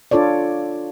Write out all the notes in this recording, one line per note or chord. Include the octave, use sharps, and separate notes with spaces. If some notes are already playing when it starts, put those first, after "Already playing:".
D4 F4 A4 C#5 D5